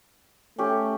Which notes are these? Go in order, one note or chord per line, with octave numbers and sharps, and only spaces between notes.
A3 C#4 G4